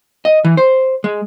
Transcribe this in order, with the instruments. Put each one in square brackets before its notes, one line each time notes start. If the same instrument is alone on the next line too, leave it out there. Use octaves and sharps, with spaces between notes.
[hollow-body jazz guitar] D#5
E3
C5
G#3